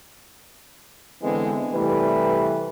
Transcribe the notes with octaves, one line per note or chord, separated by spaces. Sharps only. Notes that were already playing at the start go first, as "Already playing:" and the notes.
D3 E3 G#3 B3 C4
C3 E3 G3 A3 B4